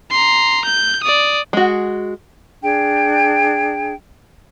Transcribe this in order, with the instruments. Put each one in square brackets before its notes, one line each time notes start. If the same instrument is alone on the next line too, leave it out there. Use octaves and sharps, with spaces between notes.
[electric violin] A#5 C6
G6
D5 D#6
[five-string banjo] G#3 F#4
[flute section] D4 G#4 G5